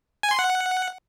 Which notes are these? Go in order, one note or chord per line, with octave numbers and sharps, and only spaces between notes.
G#5
C6
F#5